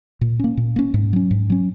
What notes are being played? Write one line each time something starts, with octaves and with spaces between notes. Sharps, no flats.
A#2
A#3 C#4
A#2
A#3 C#4
G#2
F#3 C#4
G#2
F#3 C#4